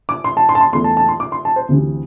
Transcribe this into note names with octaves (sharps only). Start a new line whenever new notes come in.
D6
C6
A5
C6
A5
C6
E2 E3 A3 C6
A5
A5
C6
D6
C6
A5
C5
D2 C3 E3 C4